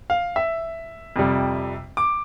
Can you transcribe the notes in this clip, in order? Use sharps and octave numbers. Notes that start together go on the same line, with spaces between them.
F5
E5
F2 C3 G3
D6